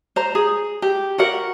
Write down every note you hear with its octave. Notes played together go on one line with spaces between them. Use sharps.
C5 A#5
G#4
G4
F#4 A#4 F#5